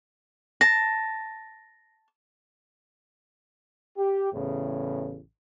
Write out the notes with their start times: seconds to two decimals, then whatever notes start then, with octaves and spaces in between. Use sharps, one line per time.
0.61 A5 A#6
3.97 G4
4.33 A1 E2 A2 C#3